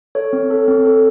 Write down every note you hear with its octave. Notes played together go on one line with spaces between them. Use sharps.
A4 C#5
C4
A4
C4
A4